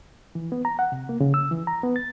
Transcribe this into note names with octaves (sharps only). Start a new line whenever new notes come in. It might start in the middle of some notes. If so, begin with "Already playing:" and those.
E3
B3
A#5
F#5
C3
A#3
C#3
E6
E3
A#5
B3
A6